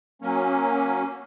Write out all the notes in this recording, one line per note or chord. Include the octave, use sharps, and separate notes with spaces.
F#3 A#3 C#4